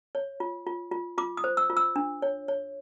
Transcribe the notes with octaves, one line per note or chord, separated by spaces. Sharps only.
C#5
F4
F4
F4
F4 D6
D#6
C5
E6
F4
E6
D4
C#5
C#5